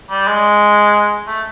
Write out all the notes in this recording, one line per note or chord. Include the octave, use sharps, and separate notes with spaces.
G3
G#3
A3